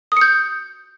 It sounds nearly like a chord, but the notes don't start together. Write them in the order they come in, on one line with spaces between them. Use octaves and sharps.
D#6 C#7 G6